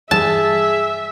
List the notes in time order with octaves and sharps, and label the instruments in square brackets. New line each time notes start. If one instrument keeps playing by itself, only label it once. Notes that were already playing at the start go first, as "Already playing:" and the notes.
[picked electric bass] G2 E3 G3 [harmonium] G#4 [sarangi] E5 [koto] A5